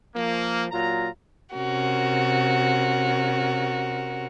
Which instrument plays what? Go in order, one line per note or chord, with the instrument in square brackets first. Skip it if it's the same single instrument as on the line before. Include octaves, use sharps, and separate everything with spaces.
[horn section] F3 A#3
A#2 F#3 F4 A#5
[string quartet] C3 C#4 F#4 A#4